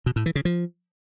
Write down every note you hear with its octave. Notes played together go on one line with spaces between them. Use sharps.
B2
A2
E3
C#3
F3